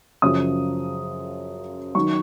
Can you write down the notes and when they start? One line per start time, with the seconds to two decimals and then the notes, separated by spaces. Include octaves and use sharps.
0.22 F#2 C#3 F3 D#6
1.95 D#3 F#3 C#6